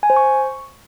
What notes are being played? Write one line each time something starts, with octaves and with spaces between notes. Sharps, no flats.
G#5
C5
C#6